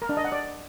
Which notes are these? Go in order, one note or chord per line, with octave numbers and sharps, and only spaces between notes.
A#4
D4
D#5
F#5
D5